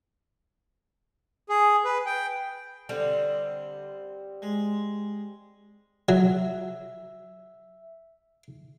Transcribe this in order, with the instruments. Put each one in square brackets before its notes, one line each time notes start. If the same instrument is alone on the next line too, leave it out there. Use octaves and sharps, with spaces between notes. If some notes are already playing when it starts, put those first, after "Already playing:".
[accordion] G#4
B4
G5
[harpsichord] D3 [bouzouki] G3 C4
[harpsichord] G#3
[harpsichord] F#3 [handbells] E5